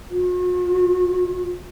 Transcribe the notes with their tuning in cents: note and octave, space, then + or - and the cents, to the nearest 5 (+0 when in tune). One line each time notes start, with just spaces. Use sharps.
F#4 -45